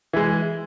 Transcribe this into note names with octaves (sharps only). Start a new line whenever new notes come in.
E3 G#3